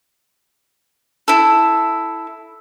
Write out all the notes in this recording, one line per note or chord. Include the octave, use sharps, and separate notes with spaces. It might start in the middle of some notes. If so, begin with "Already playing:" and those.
E4 A4